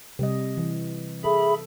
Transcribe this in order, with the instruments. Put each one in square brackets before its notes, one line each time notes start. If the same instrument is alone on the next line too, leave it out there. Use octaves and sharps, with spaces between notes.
[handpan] C3 G3 D#5
E3
[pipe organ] G#4 E5 B5 [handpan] A4